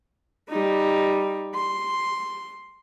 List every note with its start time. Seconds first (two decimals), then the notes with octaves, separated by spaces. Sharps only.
0.49 G3 D#4
1.55 C6